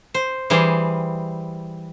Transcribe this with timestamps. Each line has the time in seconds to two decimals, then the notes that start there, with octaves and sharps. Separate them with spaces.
0.14 C5
0.50 E3 G3 G#4 C5